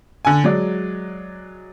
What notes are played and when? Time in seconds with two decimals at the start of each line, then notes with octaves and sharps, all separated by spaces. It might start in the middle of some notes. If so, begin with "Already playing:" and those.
0.25 D3 G#5
0.44 F#3 G#3 D5